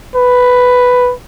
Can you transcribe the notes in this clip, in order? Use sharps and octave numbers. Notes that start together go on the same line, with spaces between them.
B4